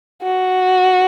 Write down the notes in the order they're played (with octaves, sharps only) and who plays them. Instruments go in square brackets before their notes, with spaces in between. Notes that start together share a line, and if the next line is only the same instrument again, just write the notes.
[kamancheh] F#4